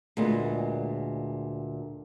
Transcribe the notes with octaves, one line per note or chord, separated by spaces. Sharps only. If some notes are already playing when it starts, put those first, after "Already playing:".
D2 A#2 G#3 B3